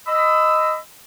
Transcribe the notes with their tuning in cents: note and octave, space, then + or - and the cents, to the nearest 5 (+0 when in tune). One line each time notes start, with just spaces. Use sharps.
D#5 +0 B5 +30 E6 +0